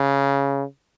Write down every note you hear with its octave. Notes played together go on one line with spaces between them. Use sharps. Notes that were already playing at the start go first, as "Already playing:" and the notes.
Already playing: C#3